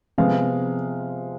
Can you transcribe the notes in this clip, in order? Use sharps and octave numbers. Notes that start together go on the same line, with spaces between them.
C3 F3 G#3 B3 F5